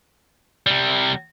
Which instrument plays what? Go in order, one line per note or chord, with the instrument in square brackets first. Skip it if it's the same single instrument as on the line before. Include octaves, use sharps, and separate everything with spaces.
[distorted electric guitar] C3 G3